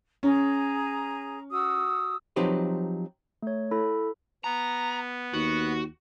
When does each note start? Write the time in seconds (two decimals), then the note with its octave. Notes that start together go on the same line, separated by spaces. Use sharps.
0.23 C#4 G#4 A#5
1.51 F#4 D#6 E6
2.36 F3 F#3 C4 D#4 G4 B4
3.42 A3 C#5
3.71 E4 A4 B5
4.44 B3 A#5
5.34 D#2 F#4